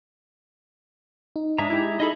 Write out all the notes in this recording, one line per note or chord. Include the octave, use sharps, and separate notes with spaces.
D#4
G#2 G#3 D4 G#4 E5 A#5
E4 G4
D#4 E4 G#4 A4 D#5 E5 B5